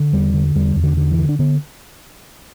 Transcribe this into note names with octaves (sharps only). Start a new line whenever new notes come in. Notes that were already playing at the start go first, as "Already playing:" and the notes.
Already playing: D3
E2 G3
D3
E2 G3
E2
D3
D3
E3
D3
D4
D3 B3